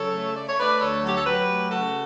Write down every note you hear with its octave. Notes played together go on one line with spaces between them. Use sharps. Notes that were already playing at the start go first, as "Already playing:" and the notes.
Already playing: C#3 F#3 A4 C#5
A3
A3 D5
C#5
A3 B4 D5
D2 A4 C#5
F#3 G4
A4
F#3 G4 B4
A3
C#3 F#4 A4